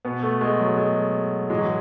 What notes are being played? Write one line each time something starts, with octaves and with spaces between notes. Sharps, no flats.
B2 B3
A3
G#3
F#3
G#3
A2 E3 G#3
F#3